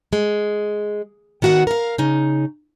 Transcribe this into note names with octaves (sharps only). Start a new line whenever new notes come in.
G#3
D#3 B3 F#4 F5 F#5
A#4 F5
C#3 D#4